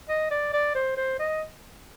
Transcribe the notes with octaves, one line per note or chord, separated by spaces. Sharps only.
D#5
D5
D5
C5
C5
D#5